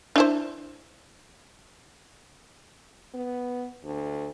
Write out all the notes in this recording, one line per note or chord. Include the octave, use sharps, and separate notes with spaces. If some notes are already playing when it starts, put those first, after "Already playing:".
D4 E4 C5
B3
D2